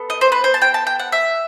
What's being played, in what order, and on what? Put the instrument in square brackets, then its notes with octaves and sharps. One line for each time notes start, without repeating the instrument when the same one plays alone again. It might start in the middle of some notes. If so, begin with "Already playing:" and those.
Already playing: [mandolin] B3 A4
D#5
C5
B4
C5
A5
G5
A5
G5
F#5
E5